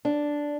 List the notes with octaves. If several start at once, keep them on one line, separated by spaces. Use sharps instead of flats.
D4